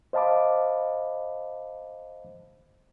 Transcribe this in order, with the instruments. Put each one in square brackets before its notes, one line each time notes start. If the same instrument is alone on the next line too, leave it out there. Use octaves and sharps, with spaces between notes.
[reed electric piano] C5 D#5 F5 A5 B5 D6